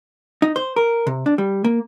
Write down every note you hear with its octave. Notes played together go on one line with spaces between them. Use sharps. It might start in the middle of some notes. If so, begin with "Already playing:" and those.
D#4
C5
A#4
C3
D4
G3
A#3